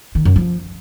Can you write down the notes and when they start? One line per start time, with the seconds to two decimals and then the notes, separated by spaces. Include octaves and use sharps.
0.15 D#3
0.25 F#2
0.36 F3